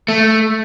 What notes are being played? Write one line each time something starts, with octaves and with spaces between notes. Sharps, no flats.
A3